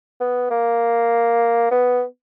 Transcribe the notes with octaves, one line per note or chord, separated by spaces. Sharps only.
B3
A#3
B3